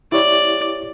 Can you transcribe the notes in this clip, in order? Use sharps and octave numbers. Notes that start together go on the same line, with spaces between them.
E4 G4 C#5 D5